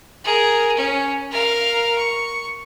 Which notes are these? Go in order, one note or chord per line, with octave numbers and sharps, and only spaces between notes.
G#4 A#4
C#4
A#4 F5
C#6